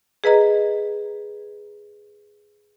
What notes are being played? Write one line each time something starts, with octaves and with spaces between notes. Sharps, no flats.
G#4 B4 D#5 A#5